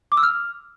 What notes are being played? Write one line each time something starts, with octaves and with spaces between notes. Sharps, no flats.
D6
E6
F6